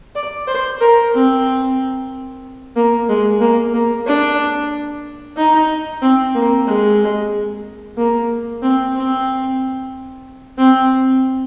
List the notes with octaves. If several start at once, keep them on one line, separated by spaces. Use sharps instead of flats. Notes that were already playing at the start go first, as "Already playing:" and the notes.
D5
C5
A#4
C4
A#3
G#3
A#3
A#3
D4
D#4
C4
A#3
G#3
A#3
C4
C4
C4